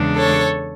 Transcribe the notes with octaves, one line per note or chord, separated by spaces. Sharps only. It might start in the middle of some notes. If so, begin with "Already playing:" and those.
Already playing: E2 C#3 G#3 D4
A4 C#5